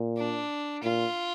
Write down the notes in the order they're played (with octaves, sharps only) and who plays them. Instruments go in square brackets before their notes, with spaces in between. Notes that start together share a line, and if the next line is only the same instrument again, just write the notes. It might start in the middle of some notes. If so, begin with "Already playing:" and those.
Already playing: [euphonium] A#2
[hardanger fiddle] D4
[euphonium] A#2 [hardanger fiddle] F4